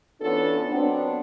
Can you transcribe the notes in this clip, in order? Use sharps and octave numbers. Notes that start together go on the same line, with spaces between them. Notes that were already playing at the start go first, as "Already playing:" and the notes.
E3 B3 C#4 D4 F4 A4
F#3 B3 C4 D4